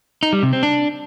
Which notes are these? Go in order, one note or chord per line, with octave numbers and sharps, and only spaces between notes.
D#4
G3
C3
C4
D4